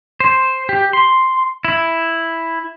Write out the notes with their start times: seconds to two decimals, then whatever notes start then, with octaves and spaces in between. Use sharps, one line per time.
0.20 C5
0.69 G4
0.93 C6
1.65 E4